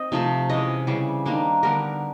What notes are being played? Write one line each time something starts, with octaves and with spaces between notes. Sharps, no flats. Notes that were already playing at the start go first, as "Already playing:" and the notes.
Already playing: C4 D#5
C3 F3 A3
C3 E3 G#3 C#4 D#5
C#3 E3 G3 C4
D#3 G3 A#3 D4
D3 G3 B3 A#4